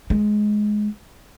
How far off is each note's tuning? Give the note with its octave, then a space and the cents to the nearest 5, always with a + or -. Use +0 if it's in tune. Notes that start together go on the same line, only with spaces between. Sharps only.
G#3 +15